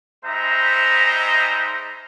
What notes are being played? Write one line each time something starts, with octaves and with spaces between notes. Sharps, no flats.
G3 G#3 D#4 C5 E5 A#5